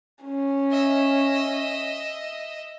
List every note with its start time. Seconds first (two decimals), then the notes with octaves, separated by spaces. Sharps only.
0.24 C#4
0.71 D#5 E5